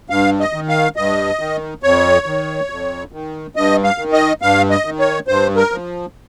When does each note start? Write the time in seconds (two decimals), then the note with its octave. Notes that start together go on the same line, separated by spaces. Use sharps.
0.10 G2 F5
0.40 D#5
0.53 D#3
0.69 F5
0.96 G2 D#5
1.39 D#3
1.83 F2 C#5
2.26 D#3
2.70 F2
3.12 D#3
3.56 G2 D#5
3.84 F5
3.98 D#3
4.13 D#5
4.42 G2 F5
4.70 D#5
4.85 D#3
4.99 C#5
5.27 G2 C5
5.56 A#4
5.72 F3